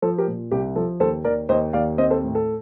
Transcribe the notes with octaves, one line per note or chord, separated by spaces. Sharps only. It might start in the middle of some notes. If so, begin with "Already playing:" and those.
F3 A4 C5
G4 A#4
A#2
C2 G4
F3 A4
D#2 A4 C5
D#2 A#4 D5
D#2 C5 D#5
D#2 D5 F5
C4 C5 D#5
A4 C5
A2
A4